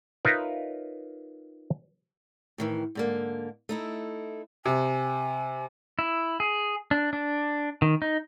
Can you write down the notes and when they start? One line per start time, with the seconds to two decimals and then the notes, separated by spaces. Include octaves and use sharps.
0.25 D#4 F4 A#4 B4 C#5 E5
2.58 A2 D#3 E3
2.95 G#2 D3 A#3
3.69 A3 D#4 E4
4.65 C3 G#5
5.99 E4
6.40 G#4
6.91 D4
7.13 D4
7.82 D#3
8.02 D#4